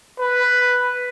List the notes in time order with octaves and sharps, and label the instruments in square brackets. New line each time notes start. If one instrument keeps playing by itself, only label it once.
[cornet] B4